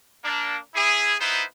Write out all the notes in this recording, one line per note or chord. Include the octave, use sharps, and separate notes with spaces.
A#3 D4
E4 G#4
B3 D#4 E4 B4 C5